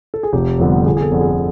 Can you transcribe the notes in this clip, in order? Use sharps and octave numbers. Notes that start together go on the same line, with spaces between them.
A4
G#4
F1 G4
F2 D3 G3 B3
G1 G#4
G#4
A4
F2 D3
G#4